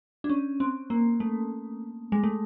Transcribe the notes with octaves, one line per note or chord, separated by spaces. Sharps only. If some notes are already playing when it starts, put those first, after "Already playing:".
D4
C#4
C4
A#3
A3
G#3
A3